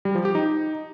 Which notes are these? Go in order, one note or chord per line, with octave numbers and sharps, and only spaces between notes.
G3
F3
G4
D#4